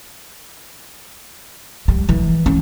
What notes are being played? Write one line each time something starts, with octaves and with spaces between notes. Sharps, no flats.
G3
E3
C#4